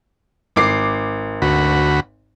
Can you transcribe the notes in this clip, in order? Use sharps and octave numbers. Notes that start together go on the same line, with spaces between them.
G#1 D6 C7
D2 F#4 B5